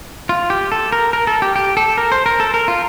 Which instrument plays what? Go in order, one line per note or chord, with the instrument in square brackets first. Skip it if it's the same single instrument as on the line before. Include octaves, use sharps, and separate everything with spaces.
[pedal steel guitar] F4
G4
A4
A#4
A#4
A4
G4
G4
A4
A#4
C5
A#4
A4
A#4
F4